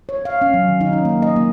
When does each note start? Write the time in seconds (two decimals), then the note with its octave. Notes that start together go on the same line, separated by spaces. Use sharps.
0.09 C#5
0.25 F5
0.41 C#4
0.54 F#3
0.68 D#3
0.81 D#4
0.93 C#4
1.05 A#3
1.22 D#5
1.36 A#3